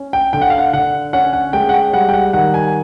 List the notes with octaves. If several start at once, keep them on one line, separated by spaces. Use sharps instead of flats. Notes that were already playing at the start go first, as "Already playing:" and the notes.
Already playing: C#4
G5
D3 G5
F#5
F5
F#5
D3 F#5
C#4 F#5
F#5
G#3 G5
F#5
G5
G3 F#5
G5
F#5
D#3 F#5
G#5